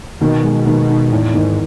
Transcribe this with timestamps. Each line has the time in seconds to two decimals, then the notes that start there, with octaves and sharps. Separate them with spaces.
0.21 B2 D#3
0.44 G#3
0.66 D#3
0.90 D#4
1.12 E2 A2
1.34 G#2 D#3